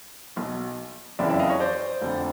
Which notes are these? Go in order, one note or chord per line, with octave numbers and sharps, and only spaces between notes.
B1 B2
F#1 F2 C#3 E3 D5 E5
D5 E5
D#5 F5
C#5 D#5
C5 D5
F1 F2 D3